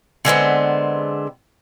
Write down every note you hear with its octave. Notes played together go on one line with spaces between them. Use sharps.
D3 G#3 B3 C4